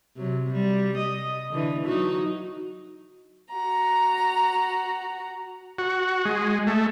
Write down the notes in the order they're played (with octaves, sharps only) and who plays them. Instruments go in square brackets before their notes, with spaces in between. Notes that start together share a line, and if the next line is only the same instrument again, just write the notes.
[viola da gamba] C3 F#3
G3
D#5
D3 E3
F#3 D#4 F#4
[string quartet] F#4 A#5
[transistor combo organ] F#4
G#3
A3